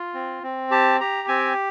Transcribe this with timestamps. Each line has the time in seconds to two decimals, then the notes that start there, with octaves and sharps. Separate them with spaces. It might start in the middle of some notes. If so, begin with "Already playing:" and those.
Already playing: F4
0.14 C4
0.43 C4
0.71 G4 A5
1.00 G4 A#5
1.28 C4 G#5